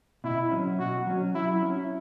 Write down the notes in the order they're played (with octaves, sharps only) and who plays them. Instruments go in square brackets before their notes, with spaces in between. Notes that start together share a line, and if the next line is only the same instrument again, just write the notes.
[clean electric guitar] B2 [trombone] E4
[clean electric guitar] F#3 C#4
[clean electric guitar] B2 [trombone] F#4
[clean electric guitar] F#3 C#4
[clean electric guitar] F#3 [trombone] E4
[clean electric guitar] C#4 E4